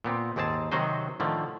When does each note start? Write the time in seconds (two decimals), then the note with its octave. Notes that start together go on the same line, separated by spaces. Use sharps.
0.04 A#2 B3 C4
0.36 D#2 G#2 C4 G#4 A5
0.72 C3 D#3 F#3 F#4 C5 D#5
1.20 A2 D3 D#3 F3